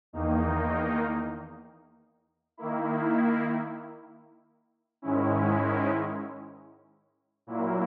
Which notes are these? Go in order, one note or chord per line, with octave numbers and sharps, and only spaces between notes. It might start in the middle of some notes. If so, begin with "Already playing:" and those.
E2 D#3 A#3 D#4
D#3 A#3 E4
G#2 D#3 G#3 C#4 E4
A#2 F#3 A#3 E4